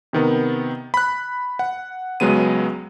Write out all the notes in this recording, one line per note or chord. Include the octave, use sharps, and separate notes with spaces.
C3 D#3 B3
B5 F#6
F#5
C#2 F#3 G#3 B3 D#7